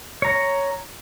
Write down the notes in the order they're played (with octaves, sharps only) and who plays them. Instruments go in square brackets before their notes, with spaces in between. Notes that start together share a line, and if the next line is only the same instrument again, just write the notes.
[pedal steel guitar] C#5 A#5